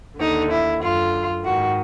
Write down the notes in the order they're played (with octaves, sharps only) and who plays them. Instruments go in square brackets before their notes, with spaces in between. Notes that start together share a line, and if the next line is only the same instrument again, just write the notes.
[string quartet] D#2 D3 D#4
E4
F#2 D3 F4
G#2 D#3 F#4